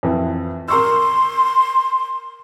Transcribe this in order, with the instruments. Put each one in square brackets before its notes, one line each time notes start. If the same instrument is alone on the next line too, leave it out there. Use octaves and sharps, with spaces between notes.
[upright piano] F2 E3
[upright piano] A#4 C#6 E6 [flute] C6